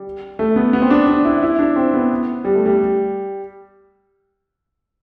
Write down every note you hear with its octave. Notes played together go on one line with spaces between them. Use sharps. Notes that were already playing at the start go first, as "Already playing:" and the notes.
Already playing: G3
A3
B3
B3
C4
D4
D4
E4
E4
D4
C4
B3
G3
A3
G3